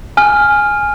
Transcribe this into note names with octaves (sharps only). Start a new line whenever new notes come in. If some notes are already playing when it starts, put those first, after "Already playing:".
G#5 F6